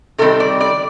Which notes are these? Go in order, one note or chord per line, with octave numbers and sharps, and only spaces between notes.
C3 D#3 G3 C4 A4
D5
D5